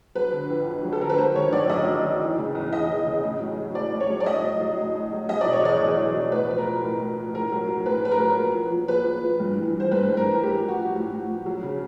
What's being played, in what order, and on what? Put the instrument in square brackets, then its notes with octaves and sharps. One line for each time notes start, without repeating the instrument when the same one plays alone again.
[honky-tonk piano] F#3 B4
D3
F2
F2
F#3
A4
D3 A#4
B4
F#3 C5
D#3 C#5
F#2 D5
F#2 D#5
F#3
D#3
E3
C#3
E2
E2 D#5
E3
C#3
A2
F#3
F#3
A2 D5
A2
C#5
F#3
D5
A2 D#5
F#3
F#3
A2
A2
F#3
F#3 D#5
D5
B2
C#5
E2 D5
E2
F#3
B2
A2 B4
F3 B4
A#4
F3
A2
A2
F3
A2 A#4
F#3
F#3
A2 B4
A2 B4
A#4
F#3
A#2
F3
F3
A#2 B4
A#2
F3
G2
E3
E3
C5
G2 B4
G2
A#4
E3
A2 G4
F3
F#4
F3
A2
A2
F3
F#3
C#3